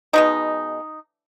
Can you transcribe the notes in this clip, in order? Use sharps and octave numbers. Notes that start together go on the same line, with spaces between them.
B2 G#3 B3 D#4